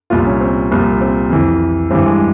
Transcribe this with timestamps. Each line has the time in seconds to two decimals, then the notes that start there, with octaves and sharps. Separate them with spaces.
0.10 C2 A#2 F3 F4
0.26 C#4
0.41 C4
0.71 C2 A#2 F3
1.01 C4
1.30 F2 E3
1.91 G2 E3 C4
2.06 G#3